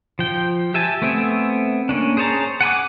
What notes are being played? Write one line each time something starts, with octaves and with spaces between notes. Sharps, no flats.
F3 G5
G4 E5 G#5 A5
A3 B3 C4 E5 G#5
A#3 C#4 D4
G#4 C5 C#5 A5 A#5
F#5 G#5 B5 D6